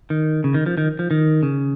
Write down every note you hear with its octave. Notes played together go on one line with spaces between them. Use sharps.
D#3
C#3
D#3
F3
D#3
F3
D#3
C#3